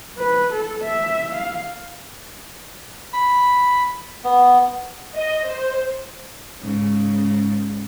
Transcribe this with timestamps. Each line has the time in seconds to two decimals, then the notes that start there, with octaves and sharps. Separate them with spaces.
0.17 B4
0.52 A4
0.83 E5
1.33 F5
3.13 B5
4.24 B3
5.15 D#5
5.47 C5
6.61 G#2 C#3